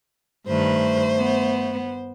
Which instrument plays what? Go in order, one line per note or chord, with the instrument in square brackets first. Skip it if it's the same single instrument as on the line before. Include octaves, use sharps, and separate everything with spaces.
[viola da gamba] G2 D#3 B4 [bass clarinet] A3 [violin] C5
[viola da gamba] B3